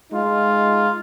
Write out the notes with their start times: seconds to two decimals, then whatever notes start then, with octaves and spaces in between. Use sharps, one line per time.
0.11 G#3 D#4 F4